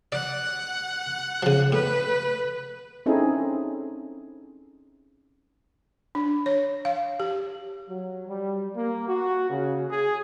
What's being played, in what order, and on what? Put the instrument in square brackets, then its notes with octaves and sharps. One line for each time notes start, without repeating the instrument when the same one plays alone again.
[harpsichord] D5 [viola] F#5
[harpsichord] C#3 F3
[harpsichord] A2 [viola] B4
[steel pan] C4 C#4 D#4 E4 G#4 A4
[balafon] D4
C#5
F5
G4
[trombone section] F#3
G3
A#3
F#4
C#3
G#4